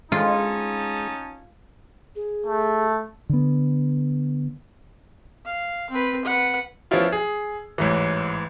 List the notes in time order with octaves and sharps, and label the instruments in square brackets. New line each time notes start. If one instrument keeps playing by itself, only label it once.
[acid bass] G#3 [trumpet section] C#4 D#4 A5 [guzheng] F4
[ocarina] G#4
[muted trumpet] A3
[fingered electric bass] D3 B3
[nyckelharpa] F5
C4 B4
B4 F#5
[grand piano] F3 B3 C#4 E4 F4
G#4
A1 G#2 E3